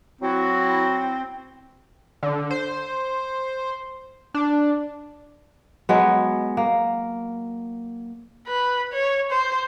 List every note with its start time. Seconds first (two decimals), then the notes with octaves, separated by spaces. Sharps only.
0.21 F#3 C4 E4 F#4
2.23 D3
2.50 C5
4.34 D4
5.89 F#3 G#3 B3
6.57 A#3
8.47 B4
8.93 C#5
9.31 C5